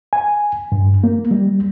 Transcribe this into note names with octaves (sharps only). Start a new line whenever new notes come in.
G#5
G2
A#3
G3